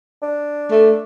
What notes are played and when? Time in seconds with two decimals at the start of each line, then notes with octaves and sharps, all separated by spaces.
0.23 D4
0.71 A3